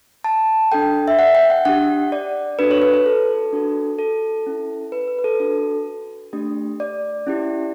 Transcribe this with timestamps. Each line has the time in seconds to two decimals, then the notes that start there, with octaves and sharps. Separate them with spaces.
0.24 A5
0.72 D4 A4 G5
1.08 E5
1.19 F#5
1.35 G5
1.50 F#5
1.65 D4 G4 F#5
2.12 D5
2.59 D4 F#4 A4 B4
2.71 C#5
2.82 B4
2.94 B4
3.06 A4
3.53 D4 F#4 A4
3.99 A4
4.46 C#4 E4 A4
4.92 B4
5.08 B4
5.18 B4
5.24 A4
5.40 D4 F#4 A4
6.33 A3 D4 G4
6.80 D5
7.27 C#4 E4 G4